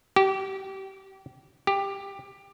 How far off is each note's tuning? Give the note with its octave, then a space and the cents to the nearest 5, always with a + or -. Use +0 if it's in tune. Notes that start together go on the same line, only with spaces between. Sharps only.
G4 -25
G4 +15